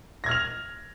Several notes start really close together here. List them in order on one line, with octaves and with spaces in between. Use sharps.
A#6 G#6 F6 F7